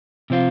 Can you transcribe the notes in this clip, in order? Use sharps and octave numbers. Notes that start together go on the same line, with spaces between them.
C3 F3 C4 F4